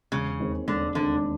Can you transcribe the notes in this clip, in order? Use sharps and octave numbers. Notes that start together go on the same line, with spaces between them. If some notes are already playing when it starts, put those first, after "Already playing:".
E1 C#3
D#2 D#3 G#3 C4
E1 D3
D#2 D3 D#3 G#3 C4